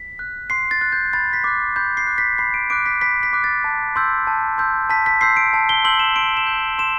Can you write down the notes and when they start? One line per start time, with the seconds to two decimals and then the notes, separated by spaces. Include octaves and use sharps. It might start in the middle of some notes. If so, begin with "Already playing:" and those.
Already playing: B6
0.19 F#6
0.50 C6 C7
0.71 A6
0.81 F#6
0.92 G6
1.13 B5 A6
1.33 B6
1.44 D6 F#6
1.76 B5 G6
1.97 C7
2.07 D6 F#6
2.18 B6
2.38 B5 C7
2.54 D7
2.70 D6 F#6 D7
2.86 B6
3.01 B5 B6
3.23 B6
3.33 D6 F#6
3.44 A6
3.64 A5
3.96 C6 E6 G6
4.27 A5
4.58 C6 E6 G6
4.90 A5 B6
5.06 B6
5.21 C6 E6 G6 C7
5.37 D7
5.54 A5
5.69 G7
5.84 C6 E6 G6 F#7
5.99 E7
6.16 C6 D7
6.37 E7
6.47 G6
6.79 C6 E7